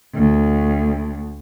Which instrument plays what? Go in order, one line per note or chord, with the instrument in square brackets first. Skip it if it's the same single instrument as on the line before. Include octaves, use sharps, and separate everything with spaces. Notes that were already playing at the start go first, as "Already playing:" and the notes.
[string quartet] D2